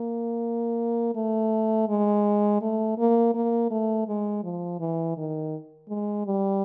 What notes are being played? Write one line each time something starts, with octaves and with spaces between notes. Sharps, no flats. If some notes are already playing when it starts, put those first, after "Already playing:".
Already playing: A#3
A3
G#3
A3
A#3
A#3
A3
G#3
F3
E3
D#3
G#3
G3